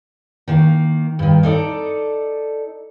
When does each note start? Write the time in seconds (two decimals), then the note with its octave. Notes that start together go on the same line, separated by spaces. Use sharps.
0.48 D#3 A#3
1.19 G2 D#3
1.43 D#4 A4 D5